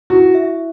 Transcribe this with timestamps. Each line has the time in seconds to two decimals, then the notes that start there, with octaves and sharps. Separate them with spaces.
0.10 E4 F#4
0.35 E5